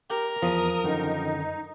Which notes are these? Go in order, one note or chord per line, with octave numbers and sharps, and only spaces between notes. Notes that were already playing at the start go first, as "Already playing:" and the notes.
G4 A#4
E2 F3 D#6
F#2 D3 D#3 D#4